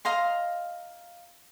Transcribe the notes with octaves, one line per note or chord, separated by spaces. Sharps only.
D#5 F5 A#5 C6